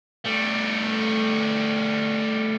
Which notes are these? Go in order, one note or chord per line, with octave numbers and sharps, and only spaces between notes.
G3 A3